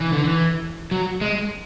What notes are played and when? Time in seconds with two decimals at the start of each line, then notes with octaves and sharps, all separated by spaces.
0.01 E3
0.13 D3
0.24 E3
0.91 F#3
1.21 G#3